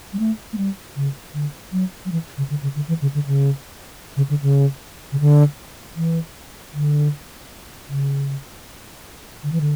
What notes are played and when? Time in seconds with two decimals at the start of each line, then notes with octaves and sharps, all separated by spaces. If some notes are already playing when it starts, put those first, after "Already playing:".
0.13 G3
0.19 A3
0.53 A3
0.58 G3
0.96 C#3
1.34 D3
1.72 F#3
2.05 F#3
2.12 E3
2.37 C#3
2.50 D3
2.63 C#3
2.76 D3
2.88 E3
3.02 C#3
3.14 D3
3.27 C#3
4.17 C#3
4.30 D3
4.42 C#3
5.12 C#3
5.20 D3
5.96 E3
6.73 D3
7.88 C#3
9.43 D3
9.52 E3
9.61 D3